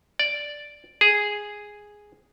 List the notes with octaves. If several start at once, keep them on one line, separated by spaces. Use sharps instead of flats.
D5
G#4